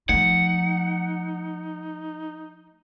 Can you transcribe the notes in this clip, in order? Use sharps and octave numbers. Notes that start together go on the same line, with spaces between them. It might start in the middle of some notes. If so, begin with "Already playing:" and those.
F3 A3 D#4 F#5